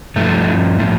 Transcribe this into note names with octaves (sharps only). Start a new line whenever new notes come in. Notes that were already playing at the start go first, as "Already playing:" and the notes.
G2 F3 A3
A2 F3